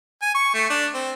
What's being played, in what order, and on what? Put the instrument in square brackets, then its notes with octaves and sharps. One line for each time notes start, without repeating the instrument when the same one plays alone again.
[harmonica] G#5
C#6
A3
D4
C4